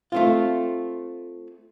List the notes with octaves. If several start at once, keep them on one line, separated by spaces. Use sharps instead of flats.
A3 C4 F4